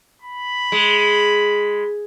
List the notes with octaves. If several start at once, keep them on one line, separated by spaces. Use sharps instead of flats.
B5
G#3